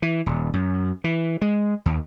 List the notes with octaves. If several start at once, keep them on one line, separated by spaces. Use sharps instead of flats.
E3
D#1
F#2
E3
G#3
D#2